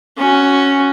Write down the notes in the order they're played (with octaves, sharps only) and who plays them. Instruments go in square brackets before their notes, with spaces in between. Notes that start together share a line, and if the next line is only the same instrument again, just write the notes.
[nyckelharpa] C#4 F#4